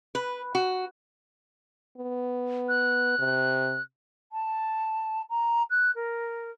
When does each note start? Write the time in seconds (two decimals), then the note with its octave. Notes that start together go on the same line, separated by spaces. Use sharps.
0.15 B4
0.55 F#4
1.98 B3
2.69 F#6
3.19 C3
4.32 A5
5.30 A#5
5.70 F#6
5.95 A#4